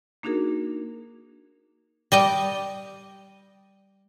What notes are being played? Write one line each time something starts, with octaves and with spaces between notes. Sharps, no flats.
A#3 D4 D#4 F#4 G#4 A#4
G3 D#5 G5